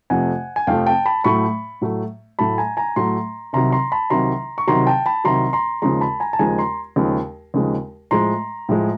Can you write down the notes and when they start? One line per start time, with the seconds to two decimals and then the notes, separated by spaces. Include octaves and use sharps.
0.10 F2 C3 F3 A3 F#5 G#5
0.56 G#5
0.67 F2 C3 F3 A3 F5 G5
0.87 G5 A5
1.05 A5 B5
1.24 A2 F#3 A3 B5 C#6
1.81 A2 F#3 A3
2.39 A2 F#3 A3 A5 B5
2.58 G#5 A#5
2.77 G#5 A#5
2.96 A2 F#3 A3 A#5 C6
3.53 C2 C3 D#3 F#3 A#5 C6
3.72 A#5 C6
3.92 A5 B5
4.10 C2 C3 D#3 F#3 A#5 C6
4.58 C#6
4.67 C2 C3 D#3 F#3 A#5 C6
4.87 G5 A5
5.06 A5 B5
5.24 C2 C3 D#3 F#3 A#5 C6
5.53 A#5 C6
5.82 D#2 C#3 F3 G#3 A#5 C6
6.01 A5 B5
6.20 G#5 A#5
6.33 A5
6.39 D#2 C#3 F3 G#3 G#5 A#5
6.58 A#5 C6
6.96 D#2 C#3 F3 G#3
7.54 D#2 C#3 F3 G#3
8.11 A2 F3 G#3 A#5 C6
8.69 A2 F3 G#3